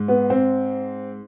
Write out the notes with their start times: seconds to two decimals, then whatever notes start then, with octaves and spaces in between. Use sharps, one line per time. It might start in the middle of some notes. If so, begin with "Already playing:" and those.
Already playing: G#2
0.08 B3
0.30 C4